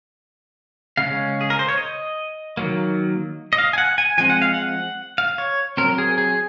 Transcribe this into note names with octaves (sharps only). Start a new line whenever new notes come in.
C#3 G#3 C#4 F5
G#4
A#4
C5
C#5
D#5
D#3 F#3 A#3
D#5
F5
G#5
F#5
G#5
F3 G#3 C4 G#5
F#5
F5
F#5
F5
C#5
F#3 C4 A#4
G#4
G#4